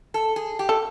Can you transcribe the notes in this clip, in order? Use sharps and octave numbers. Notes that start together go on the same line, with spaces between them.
A4
G#4
G4
A4